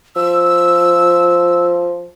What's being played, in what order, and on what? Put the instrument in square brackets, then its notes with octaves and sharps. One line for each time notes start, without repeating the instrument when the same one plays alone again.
[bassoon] F3 [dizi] E6